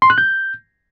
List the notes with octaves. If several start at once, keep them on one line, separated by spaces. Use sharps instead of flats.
C6
F#6
G6